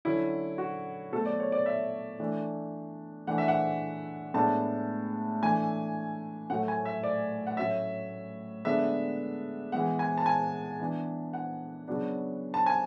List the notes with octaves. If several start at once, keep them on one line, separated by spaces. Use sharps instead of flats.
D3 F#3 C#4 E4
F#4
B2 F#3 A3 A4
D5
C#5
D5
E5
E3 A3 D4
E3 A3 D4 F#5
E5
F#5
A2 G#3 B3 D4 A5
E3 A3 D4 G#5
A2 F#3 A3 F#5
G#5
E5
D5
F#5
A2 F#3 C#4 E5
D3 G#3 B3 D4 E5
E3 G#3 B3 F#5
G#5
A5
G#5
E3 B3 D4
F#5
C#3 F#3 B3 D4
A5
G#5